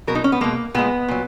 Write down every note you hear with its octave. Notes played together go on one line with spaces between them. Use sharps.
B2 F#3 A#4
D#4
C#4
B3
B2 G#3 A#3
A#2 G#3 B3
A#2 F#3